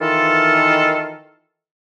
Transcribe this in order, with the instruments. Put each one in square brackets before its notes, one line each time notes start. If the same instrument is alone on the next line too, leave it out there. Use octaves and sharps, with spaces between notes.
[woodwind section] D#3 E3 F4 A4